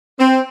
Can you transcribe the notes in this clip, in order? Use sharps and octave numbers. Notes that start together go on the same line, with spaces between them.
C4